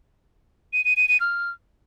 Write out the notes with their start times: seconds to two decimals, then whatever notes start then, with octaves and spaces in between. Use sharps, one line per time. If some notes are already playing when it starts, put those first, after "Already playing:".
0.73 D#7
0.85 D#7
0.97 D#7
1.08 D#7
1.20 F6